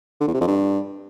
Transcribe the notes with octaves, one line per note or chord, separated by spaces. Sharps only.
D3
E2
C3
F2
G2